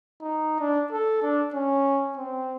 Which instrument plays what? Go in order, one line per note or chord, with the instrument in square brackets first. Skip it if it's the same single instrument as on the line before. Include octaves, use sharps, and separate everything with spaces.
[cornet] D#4
D4
A4
D4
C#4
C4